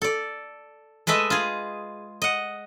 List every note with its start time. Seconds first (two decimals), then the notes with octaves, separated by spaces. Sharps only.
0.02 A4 D5
1.07 G#3 A3 B4 D#5 E5
1.30 F4 G#4
2.22 D#5 F#5